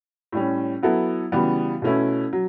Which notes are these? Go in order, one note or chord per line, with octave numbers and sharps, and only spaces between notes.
A2 G3 C#4
F#3 B3 E4 A4
C#3 E3 G3 B3 F#4
B2 A3 C#4 E4
F#3